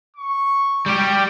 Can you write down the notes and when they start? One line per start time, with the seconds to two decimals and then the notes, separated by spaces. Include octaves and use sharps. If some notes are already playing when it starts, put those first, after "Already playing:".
0.16 C#6
0.86 G3 G4